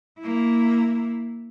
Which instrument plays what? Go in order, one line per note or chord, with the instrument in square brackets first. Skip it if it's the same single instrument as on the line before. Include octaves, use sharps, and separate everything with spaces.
[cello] A#3 E4